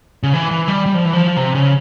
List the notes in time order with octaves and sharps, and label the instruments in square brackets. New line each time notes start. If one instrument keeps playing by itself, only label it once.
[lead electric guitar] C#3
E3
E3
G3
G3
F3
E3
F3
C3
C#3